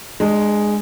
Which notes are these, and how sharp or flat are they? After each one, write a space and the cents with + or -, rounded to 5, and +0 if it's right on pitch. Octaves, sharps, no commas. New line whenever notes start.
G#3 +0 D4 +30